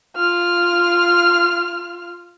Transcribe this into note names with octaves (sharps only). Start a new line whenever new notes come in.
F4 F6